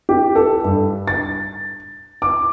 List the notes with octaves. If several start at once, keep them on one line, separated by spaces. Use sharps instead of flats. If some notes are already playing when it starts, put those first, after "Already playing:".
G4
A4
G2
A6
D6